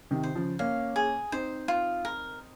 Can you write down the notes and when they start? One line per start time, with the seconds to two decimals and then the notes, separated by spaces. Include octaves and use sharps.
0.11 C3 D#3
0.23 C5
0.35 C#3 F3
0.59 A#3 C#4 F5
0.96 G#4
1.32 C4 D#4 C5
1.68 F4
2.05 A#4